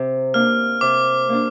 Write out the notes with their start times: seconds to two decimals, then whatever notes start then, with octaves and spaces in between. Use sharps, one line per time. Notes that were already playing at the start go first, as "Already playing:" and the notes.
Already playing: C3
0.34 A#3 D4 F6
0.81 C3 D6
1.29 A#3 D4